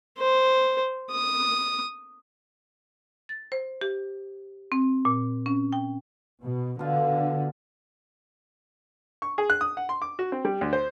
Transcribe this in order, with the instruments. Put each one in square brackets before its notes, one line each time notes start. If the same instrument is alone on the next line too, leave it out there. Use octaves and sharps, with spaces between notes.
[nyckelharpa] C5
D#6
[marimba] A6
C5
G4
C4
A#2
C#4
G5
[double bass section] B2
[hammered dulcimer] B2 F4 [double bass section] D3
[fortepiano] C#6
G#4
F#6
D#6
F#5
C6
D6
F#4
C4
G3
D2
C5